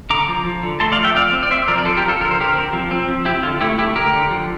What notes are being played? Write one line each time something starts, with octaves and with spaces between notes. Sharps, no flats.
D3 A#5 D6
F3
F3
D3
A3 A5 C6
D5 F5
F3
E5 G5
C4 D5 F5
C4
D5
C4 C5 E5
F3 A#4 D5
D5
F3 A4 C5
G4 A#4
F3
F4 A4
D3 A#4
C5
D3 G4 A#4
C4
F3
C4
F3
C4 E4 G4
D3 F4
A3 E4 G4
A3 E4 G4
D3 G4 A#4
D3
F3